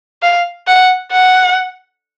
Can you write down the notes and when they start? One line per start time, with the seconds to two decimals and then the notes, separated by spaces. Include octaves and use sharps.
0.23 F5
0.67 F#5
1.12 F#5